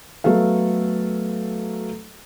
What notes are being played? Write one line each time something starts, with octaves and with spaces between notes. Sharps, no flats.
F#3 A3 B3 A4 F5